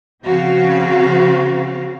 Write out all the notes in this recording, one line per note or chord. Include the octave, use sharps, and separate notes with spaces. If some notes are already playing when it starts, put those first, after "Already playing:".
C#3 F3 C4 F#4 F5